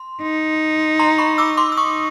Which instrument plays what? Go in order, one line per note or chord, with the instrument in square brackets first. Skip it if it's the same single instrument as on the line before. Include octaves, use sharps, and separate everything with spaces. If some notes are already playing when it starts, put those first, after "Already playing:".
Already playing: [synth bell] C6
[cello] D#4
[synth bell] A#5 C6
B5 C#6
D6 E6
C6 D6
E6
[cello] D#4 [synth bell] C#6 D#6